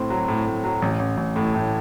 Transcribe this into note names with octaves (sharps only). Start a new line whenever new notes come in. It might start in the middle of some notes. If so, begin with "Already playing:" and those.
Already playing: A2 C4
F#3
A2
A2
F#3
A1
A1
A1
A2
A2